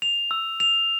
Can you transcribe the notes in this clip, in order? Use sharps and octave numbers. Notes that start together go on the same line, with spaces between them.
F7
E6
F7